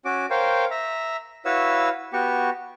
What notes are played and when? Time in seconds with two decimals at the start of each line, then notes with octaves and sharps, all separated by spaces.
0.05 C#4 F#4 D6
0.30 A#4 C5 C#5 F5 G5
0.71 E5 A#5
1.45 E4 F#4 B4 C#5 F5 E6
2.13 B3 F#4 G4 C#6